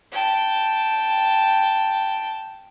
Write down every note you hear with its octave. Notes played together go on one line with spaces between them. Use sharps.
G5 A5